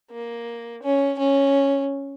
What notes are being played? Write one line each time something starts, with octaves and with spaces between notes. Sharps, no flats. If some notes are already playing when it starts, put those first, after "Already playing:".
A#3
C#4
C#4